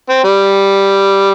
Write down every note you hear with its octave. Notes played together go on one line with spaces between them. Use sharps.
C4
G3